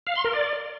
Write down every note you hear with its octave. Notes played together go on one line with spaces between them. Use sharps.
F5
C6
A#4
D5